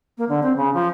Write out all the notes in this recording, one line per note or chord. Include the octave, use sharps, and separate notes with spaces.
A#3
D3
C4
C#3
F3